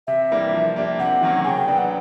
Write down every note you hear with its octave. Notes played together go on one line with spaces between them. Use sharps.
C3 E5
E3 G3 A#3 D4
F3
A#3 D4 G4
C3 F#5
D#3 F#3 A#3 C#4
C#3 G5 G#5
F#3 B3 D4 F#4
F#5